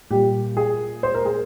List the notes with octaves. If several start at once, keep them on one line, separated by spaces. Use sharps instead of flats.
A#2 G3 G4
G#4
C5
A#4
G#4